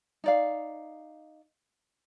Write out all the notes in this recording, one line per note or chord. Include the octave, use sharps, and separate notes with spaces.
D#4 D5 F5